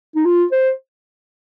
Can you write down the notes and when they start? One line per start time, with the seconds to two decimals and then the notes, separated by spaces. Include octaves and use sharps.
0.16 D#4
0.25 F4
0.52 C5